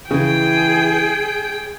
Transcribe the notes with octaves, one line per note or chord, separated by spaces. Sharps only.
C#3 E3 G#4 G5